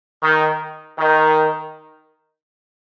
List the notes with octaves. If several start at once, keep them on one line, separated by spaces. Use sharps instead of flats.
D#3
D#3